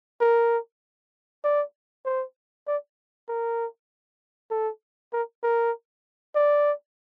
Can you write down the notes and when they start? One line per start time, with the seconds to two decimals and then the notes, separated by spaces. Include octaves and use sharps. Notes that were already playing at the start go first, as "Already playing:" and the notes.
0.21 A#4
1.44 D5
2.05 C5
2.67 D5
3.29 A#4
4.51 A4
5.13 A#4
5.43 A#4
6.35 D5